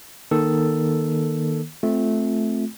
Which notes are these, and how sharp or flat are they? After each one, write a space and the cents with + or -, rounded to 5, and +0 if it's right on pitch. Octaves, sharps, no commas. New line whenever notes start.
D#3 +0 A#3 +25 A4 +0
A3 -15 C4 +0 F4 +0